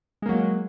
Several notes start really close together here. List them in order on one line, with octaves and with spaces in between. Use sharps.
G#3 A#3 F#3